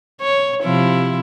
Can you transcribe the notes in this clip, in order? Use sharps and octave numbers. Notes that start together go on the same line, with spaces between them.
C#5
C3 F3 E4